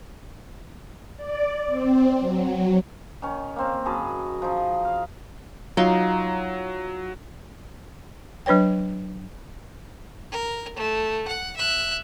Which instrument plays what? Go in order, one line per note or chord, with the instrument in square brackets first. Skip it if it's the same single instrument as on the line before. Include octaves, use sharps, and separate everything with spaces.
[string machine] D5
C4
F#3
[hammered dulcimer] D#3 C#4
A#3 C4
F#2 G#4 A5 B5
F3 D#4
D#5 F5
[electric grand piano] F#3 [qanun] D#4 F4 C6
[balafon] F#3 D4 B4 C#5 G5
[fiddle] A#4
A3
F#5
E5 F#6